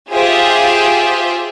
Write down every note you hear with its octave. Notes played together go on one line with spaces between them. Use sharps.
F4 G4 G#4 C5 E5